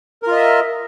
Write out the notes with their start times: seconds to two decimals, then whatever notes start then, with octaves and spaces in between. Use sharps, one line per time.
0.23 A#4
0.27 F4
0.32 D#5
0.36 E5